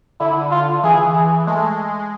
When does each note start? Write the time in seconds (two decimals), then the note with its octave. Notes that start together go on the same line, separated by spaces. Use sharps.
0.20 D3 E4
0.51 F4
0.83 E3 G#4
1.16 G#4
1.47 G#3 A3